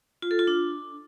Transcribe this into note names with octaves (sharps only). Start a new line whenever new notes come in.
F4
A4
F4
D4